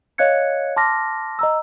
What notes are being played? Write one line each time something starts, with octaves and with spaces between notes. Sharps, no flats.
C#5 D#5 F5 F#6 G#6 C#7
A5 C6 D6 F6 A#6
D#5 A#5 E6